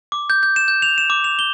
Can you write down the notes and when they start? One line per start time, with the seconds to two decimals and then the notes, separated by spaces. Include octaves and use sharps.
0.12 D6
0.30 G6
0.43 G6
0.56 E7
0.68 G6
0.82 F7
0.98 E7
1.10 D6
1.24 F7
1.39 G7